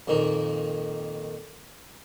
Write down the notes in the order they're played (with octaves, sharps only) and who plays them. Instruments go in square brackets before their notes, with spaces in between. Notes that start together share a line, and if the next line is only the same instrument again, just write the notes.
[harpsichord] F2 A#2 D#3